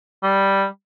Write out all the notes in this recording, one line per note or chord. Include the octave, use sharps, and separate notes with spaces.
G3